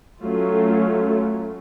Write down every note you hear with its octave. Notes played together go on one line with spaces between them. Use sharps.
F#3 A3 C#4 F4